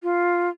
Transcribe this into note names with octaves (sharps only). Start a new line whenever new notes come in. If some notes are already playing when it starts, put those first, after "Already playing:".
F4